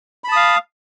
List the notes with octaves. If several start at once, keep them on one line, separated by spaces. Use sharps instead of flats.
F5 A5 B5 D#6